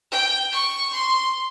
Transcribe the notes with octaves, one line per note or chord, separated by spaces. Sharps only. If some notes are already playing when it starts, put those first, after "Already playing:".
G5
C#6
C6